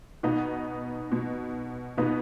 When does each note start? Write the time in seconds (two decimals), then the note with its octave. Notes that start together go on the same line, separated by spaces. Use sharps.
0.23 B2 B3 D#4
1.12 B2
1.98 B2 B3 D#4